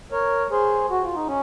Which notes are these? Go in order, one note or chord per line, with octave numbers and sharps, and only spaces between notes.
A#4 C#5
G#4 C5
F#4
F4
D#4
C#4